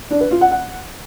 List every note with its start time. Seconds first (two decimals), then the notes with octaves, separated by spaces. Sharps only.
0.11 D4
0.21 B4
0.31 F4
0.41 F#5
0.52 F#5